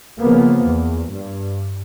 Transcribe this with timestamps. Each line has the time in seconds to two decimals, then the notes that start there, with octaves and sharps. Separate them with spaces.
0.19 C#3 F3 A#3 B3
0.64 E2
1.11 G2